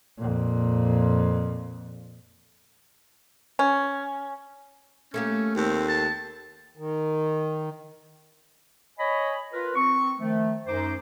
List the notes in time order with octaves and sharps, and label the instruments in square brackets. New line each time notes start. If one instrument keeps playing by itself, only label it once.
[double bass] F2 A#2
[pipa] C#4
[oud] A3 A#3 G4 [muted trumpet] C#4
[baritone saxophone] D#2 [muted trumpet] C4
[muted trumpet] A5
[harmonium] D#3
[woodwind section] C#5 D#5 G#5 B5
F4 A#4 B4
C4 C#6
D#3 F3 A3
F#2 D#4 C5 D6